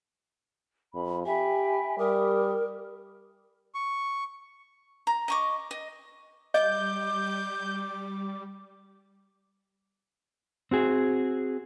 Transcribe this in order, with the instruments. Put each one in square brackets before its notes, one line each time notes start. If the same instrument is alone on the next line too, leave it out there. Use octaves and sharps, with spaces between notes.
[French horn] F2 [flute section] B5
[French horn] G4 [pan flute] E5 [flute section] G5 G#5 B5
[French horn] G3 [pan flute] A#4 [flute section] D6 D#6
[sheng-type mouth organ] C#6
[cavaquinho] A#5
D#5 C#6 D6
D#5
[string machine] G3 [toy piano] D#5 [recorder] D6 [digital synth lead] G6
[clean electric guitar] C4 F#4 G#4